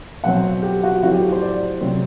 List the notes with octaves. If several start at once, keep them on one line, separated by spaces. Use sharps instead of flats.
B2 F#3 C4 F#5
G4
F#4
A2 F#3 C4 F#4
G4
C5
D5
C3 F#3 C4